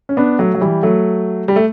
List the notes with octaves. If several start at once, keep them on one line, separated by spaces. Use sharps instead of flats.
C#4
B3 D4
F#3 A3
F#3
E3 G3
F#3 A3
G3
A3